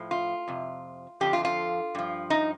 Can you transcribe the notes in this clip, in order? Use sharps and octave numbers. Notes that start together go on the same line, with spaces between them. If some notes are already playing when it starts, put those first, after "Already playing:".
Already playing: A2 F3
F4
F2 C3
F2 D3 F3 G4
F4
F4
G2 F3
D#4